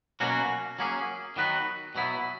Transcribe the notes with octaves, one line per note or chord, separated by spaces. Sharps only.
B2 F#3 A#3 C#4 F#4
F#3 A#3 C#4 G#4
D#3 F#3 B3 F#4 B4
B2 F#3 B3 E4